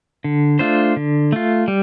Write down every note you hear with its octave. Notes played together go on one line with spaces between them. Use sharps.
D3
A3 D4 F4 C5
D3
A3 F4
G3